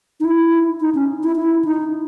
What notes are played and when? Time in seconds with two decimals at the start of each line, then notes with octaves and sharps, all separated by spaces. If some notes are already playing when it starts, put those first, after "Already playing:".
0.20 D#4
0.25 E4
0.80 D#4
0.95 C#4
1.23 E4
1.36 E4
1.65 D#4